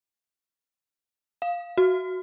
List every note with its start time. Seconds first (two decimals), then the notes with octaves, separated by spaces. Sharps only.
1.42 F5
1.78 F#4